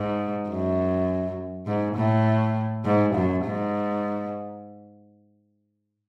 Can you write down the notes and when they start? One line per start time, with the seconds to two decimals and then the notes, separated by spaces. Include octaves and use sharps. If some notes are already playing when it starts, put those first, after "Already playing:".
Already playing: G#2
0.49 F#2
1.67 G#2
1.96 A2
2.85 G#2
3.15 F#2
3.45 G#2